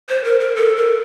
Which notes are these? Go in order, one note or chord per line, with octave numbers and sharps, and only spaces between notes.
C5
A#4
A#4
A4
A#4